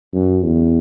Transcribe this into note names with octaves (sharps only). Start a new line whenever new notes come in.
F#2
E2